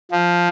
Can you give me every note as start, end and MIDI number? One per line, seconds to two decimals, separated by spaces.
0.11 0.48 53